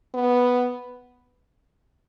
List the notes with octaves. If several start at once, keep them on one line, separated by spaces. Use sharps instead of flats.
B3